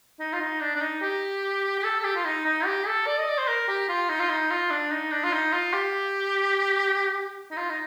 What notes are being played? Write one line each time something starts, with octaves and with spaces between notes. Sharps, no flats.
D#4
F4
D#4
D4
D4
D#4
G4
G4
A4
A4
G4
F4
D#4
D#4
G4
A4
D5
D#5
D5
C5
A#4
G4
F4
D#4
F4
D#4
F4
D4
D#4
D4
F4
D#4
F4
G4
D#4
F4
D#4